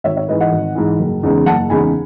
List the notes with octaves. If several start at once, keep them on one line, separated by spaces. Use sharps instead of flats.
G#1 C#5 E5
C#5 E5
G#2 E3 B4 D#5
D#5 F#5
G#1
G#2 E3
F#1
E2 C#3 G#3 D#4
F#1 F#5 A5
E2 C#3 G#3 D#4 G#5 B5